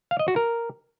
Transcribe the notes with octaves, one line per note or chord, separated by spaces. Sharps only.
F5
D#5
F#4
A#4